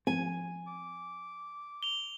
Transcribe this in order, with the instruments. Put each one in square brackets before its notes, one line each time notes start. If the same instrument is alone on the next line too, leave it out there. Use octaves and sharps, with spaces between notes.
[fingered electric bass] F3 C4 [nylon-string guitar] G#5
[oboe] D6
[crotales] F7 G7